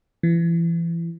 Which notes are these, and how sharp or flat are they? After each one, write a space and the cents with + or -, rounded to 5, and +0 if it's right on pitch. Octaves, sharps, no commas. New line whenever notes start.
E3 +30